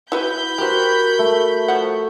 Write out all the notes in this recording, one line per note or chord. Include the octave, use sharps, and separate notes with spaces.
E4 F#4 B4 B5 G6
F#4 G4 A#4 C5
A3
F3 F#5